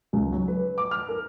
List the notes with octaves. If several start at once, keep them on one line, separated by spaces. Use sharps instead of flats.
C#2
F#3
B4
D6
F6
A#4